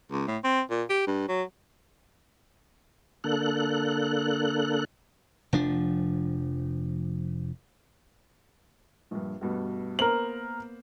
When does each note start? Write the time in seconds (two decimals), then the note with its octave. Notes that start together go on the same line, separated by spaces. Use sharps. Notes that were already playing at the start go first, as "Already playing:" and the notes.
0.11 C#2
0.28 A2
0.44 C4
0.70 A#2
0.89 G4
1.07 G2
1.28 F#3
3.24 D3 A#3 A4 F#6
5.53 F1 F3 D4
9.11 A#1 G2
9.41 D2 G2 B2
9.99 A#3 B3 A#4 C5 F#7